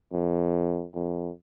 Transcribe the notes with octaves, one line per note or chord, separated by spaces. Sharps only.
F2
F2